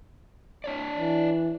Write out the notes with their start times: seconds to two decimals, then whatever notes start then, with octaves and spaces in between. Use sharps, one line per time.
0.64 D4 C#5 D5
0.96 E3